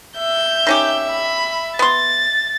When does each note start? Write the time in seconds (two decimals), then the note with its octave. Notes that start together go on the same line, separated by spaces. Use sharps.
0.18 E5 G6
0.67 D#3 C#4 G4
1.11 B5
1.79 B3 C6 A6